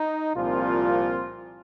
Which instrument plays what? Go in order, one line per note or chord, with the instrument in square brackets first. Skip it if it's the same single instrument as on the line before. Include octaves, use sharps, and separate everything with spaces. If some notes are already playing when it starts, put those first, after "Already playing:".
Already playing: [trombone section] D#4
C2 A#2 F3 C4 F4